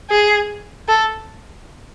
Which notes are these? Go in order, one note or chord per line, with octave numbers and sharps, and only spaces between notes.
G#4
A4